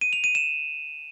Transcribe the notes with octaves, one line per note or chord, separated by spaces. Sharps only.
D#7
F7
D#7
E7